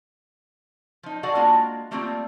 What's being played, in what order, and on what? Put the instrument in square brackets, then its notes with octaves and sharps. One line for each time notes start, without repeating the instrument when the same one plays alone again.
[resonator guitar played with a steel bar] F3 D#4
F#4 G#4 A4 D5 F5 F#5
G#3 A#3 D4 F4 F#4 A#4
G3 A3 A#3 C4 E4 F4